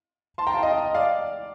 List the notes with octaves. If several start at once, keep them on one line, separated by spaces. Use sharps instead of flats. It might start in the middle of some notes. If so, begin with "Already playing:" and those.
A5 C6
G5 A#5
F5 A5
D#5 G5
D#5
D5 F5